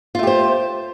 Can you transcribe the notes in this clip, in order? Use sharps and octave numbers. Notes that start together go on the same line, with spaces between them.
A3 F4 G4 C5